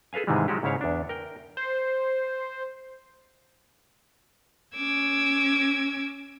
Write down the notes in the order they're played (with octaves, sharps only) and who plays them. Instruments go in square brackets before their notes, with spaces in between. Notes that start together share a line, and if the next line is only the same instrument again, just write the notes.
[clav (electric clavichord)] G#4 A4 B4 F5 G#5
G#2 C3 D#3 E3 G3 G#3
F3 F#3 G#3 F#4 G4
G#2 C#3 E4 C#5 F5
E2 D4
A#4 G5
[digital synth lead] C5
[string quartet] C#4 D6 E6 G#6